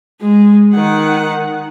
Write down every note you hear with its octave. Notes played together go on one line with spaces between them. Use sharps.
G#3
D#3 F#5